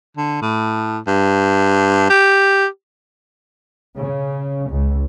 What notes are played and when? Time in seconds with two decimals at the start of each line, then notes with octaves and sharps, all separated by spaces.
0.17 D3
0.42 A2
1.07 G2
2.10 G4
3.98 C#3
4.71 C#2